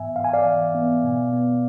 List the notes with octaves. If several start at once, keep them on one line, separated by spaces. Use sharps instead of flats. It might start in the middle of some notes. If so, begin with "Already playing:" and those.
Already playing: G#2 E3 B3 E5 G#5
G#2 F5
G#5
D5 F5
E3
B3
B2
B3